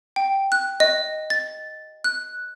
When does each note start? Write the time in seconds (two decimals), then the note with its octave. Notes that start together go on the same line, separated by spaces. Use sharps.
0.16 G5
0.52 F#6
0.80 D#5
1.30 A6
2.04 F#6